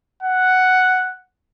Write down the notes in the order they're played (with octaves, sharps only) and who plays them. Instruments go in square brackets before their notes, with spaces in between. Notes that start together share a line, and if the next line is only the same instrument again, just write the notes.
[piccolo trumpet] F#5